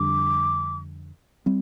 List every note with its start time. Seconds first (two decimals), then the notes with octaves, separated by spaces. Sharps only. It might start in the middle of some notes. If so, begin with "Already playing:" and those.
Already playing: F2 D3 G3 D4 D6
1.46 G3 C4